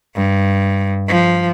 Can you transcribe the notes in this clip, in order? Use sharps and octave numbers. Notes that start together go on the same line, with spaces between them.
G2
F3